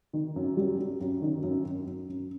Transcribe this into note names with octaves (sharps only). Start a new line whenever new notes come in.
D#3
F#2
G3
F#2
F#2
D#3
F#2
F#2
F#2
F#2